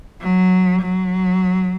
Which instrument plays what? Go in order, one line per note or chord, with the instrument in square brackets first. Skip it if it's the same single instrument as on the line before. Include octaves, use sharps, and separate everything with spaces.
[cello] F#3
F#3